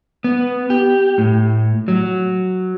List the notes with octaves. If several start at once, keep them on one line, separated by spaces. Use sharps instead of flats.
B3
G4
A2
F#3